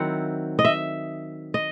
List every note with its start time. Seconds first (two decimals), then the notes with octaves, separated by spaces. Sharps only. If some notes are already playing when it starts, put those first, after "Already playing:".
Already playing: D#3 F#3 C4 E4 F#5
0.59 D#5
0.65 E5
1.54 D#5